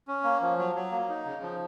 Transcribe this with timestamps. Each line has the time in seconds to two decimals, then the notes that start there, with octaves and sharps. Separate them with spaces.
0.08 C#4
0.24 A#3
0.41 F3
0.58 F#3
0.75 F#3
0.92 A#3
1.09 D#4
1.25 C#3
1.42 F3